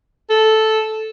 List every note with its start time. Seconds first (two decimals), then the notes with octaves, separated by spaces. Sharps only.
0.30 A4